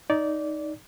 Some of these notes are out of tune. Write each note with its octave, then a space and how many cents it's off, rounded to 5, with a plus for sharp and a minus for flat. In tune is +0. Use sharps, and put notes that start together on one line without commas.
D#4 +0 D5 -15